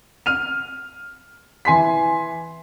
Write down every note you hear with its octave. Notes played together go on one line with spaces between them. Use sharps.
F6 D#7 F7
E3 G#5 C6 B6